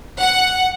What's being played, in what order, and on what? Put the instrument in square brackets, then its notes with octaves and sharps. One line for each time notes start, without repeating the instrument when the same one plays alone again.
[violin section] F#5